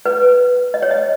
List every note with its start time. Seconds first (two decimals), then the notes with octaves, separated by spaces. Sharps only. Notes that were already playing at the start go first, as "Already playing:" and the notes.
0.05 B4
0.74 D#5
0.82 C#5
0.91 D#5